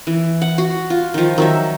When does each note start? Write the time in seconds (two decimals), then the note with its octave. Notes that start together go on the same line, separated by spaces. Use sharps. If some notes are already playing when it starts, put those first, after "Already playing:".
0.07 E3
0.42 F#5
0.58 F#4
0.90 F4
1.14 D#3 F3
1.38 D#3 F#3 E5